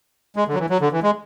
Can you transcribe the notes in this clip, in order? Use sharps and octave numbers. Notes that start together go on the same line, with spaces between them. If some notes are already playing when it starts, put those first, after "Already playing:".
G#3
D3
F#3
E3
F#3
D3
E3
G#3